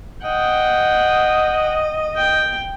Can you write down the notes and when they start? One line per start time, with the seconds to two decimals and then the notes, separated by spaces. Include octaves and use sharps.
0.24 D#5 F#5 G5
2.16 G5